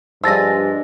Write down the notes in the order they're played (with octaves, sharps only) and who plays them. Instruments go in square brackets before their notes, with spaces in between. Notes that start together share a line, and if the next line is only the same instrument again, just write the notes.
[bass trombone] G2 [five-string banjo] F3 G#5 [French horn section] G#3 D4 [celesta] E6 A6 A#6